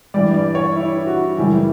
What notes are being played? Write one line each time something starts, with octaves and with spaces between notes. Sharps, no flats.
G2 E3 G3 D5
D5
C#5
E4
F#4
F#2 C#3 E3 G3 E4